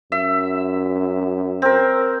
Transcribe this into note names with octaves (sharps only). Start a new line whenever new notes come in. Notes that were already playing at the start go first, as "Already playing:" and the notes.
F#2 E5
C4 A#4